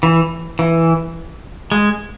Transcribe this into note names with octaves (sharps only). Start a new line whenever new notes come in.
E3
E3
G#3